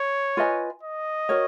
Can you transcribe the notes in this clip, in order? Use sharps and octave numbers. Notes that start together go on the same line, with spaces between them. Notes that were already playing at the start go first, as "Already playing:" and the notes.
Already playing: C#5
F4 B4 D#5 G#5
D#5
F#4 A#4 C#5